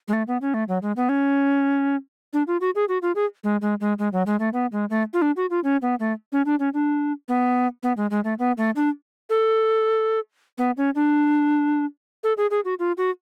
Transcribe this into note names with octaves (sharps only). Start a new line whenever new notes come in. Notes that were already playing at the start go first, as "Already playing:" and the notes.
G#3
A3
B3
C#4
A3
F#3
G#3
B3
C#4
D4
F4
F#4
G#4
F#4
F4
G#4
G#3
G#3
G#3
G#3
F#3
G#3
A3
B3
G#3
A3
F4
D4
F#4
F4
C#4
B3
A3
C#4
D4
C#4
D4
B3
B3
G#3
G#3
A3
B3
A3
D4
A4
B3
C#4
D4
A4
G#4
G#4
F#4
F4
F#4